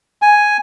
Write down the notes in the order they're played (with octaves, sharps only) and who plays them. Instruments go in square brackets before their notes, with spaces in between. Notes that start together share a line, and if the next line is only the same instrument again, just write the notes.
[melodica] G#5